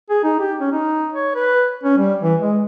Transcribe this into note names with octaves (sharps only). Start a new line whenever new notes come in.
G#4
D#4
G4
C#4
D#4
C#5
B4
C#4
G3
E3
G#3